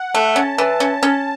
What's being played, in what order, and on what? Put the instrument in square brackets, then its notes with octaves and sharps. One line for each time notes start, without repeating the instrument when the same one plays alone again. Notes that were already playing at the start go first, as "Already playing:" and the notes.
Already playing: [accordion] F#5
[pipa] A3
[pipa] C#4 [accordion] A5
[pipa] E3
C#4
C#4